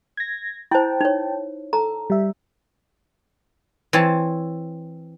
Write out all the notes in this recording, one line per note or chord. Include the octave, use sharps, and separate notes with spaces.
G#6 A#6
E4 C5 G5 A5
D#4 C#5
A4 A#5
G3 E5
E3 C4 C#5 A5